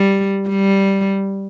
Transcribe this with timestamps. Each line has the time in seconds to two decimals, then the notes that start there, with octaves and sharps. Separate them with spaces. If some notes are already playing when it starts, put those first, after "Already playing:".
Already playing: G3
0.49 G3